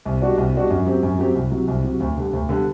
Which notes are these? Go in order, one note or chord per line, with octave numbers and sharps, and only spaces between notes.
C2
B2 G3 D4 F#4
C2
B2 G3 D4 F#4
F#2
F#3 C4 G4
F#2
F#3 C4 G4
C2
C3 F#3
C2
C3 F#3
D2
D3 G3 B3
D2
D3 G3 B3